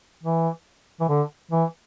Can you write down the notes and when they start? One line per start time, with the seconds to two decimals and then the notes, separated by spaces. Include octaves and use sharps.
0.23 E3
1.01 E3
1.09 D3
1.51 E3